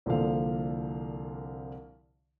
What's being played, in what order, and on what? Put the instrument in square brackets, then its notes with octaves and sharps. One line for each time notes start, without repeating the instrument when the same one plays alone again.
[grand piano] C2 A#2 D3 F3 F5